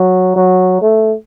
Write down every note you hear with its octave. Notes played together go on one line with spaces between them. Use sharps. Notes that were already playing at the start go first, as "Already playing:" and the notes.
Already playing: F#3
F#3
A3